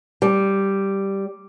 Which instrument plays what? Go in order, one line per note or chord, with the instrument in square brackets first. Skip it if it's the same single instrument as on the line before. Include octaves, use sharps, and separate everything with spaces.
[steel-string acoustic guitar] G3